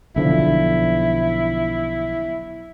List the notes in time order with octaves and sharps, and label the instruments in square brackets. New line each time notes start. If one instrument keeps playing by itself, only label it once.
[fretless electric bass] B1 D3 F3 [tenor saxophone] E4